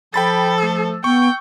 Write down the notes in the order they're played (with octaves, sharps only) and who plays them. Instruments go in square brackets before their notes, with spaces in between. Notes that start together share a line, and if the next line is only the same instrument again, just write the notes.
[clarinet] F3 [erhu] A4 [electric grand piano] G5 B5 A6
[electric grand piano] A3 E6
[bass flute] B3 [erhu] G5 [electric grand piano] C#6